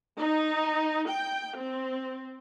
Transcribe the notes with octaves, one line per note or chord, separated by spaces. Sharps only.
D#4
G5
C4